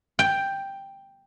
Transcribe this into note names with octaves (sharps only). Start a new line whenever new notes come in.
G5